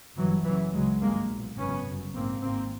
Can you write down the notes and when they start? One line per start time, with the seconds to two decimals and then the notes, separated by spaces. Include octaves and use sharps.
0.17 G1 G2 E3 F#3
0.45 F#1 F#2 C#3 E3 F#3
0.74 C#2 F#3 G#3
0.77 C#3
1.02 G#1 G2 G#3 A#3
1.30 B1 A#2
1.58 G#1 F#2 C#3 B3 C#4
1.86 G1 F#2 C#3
2.14 A#1 G#2 A#3 C4
2.42 G#1 A#3 C4
2.46 G#2